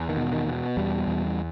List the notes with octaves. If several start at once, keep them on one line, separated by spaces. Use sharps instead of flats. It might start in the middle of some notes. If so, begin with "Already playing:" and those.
Already playing: E2
D#3
B2
D#3
B2
E2 G3
E2